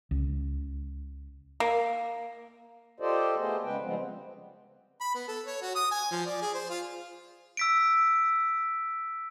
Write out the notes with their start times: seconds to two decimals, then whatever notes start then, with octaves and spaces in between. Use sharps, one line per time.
0.11 C#2
1.60 A#3
3.00 F4 G4 A4 C5 D5 D#5
3.38 A3 B3 G#4 C5 D#5
3.64 C#3 G#3 B3 B4 G5
3.83 C#3 F3 G3 G#3 B3 C4
5.01 B5
5.15 B3
5.28 A4
5.46 C#5
5.62 F#4
5.76 D#6
5.91 G#5
6.11 F3
6.26 D5
6.42 G#4
6.55 C5
6.70 F4
7.57 E6 B6 D7